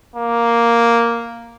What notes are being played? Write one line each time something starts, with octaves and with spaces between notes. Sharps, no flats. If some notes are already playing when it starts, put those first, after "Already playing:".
A#3